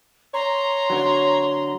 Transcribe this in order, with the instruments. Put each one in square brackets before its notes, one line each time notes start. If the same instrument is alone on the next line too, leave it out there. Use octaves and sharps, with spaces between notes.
[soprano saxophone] C#5 [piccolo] A#5 [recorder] C6
[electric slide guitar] D3 F#3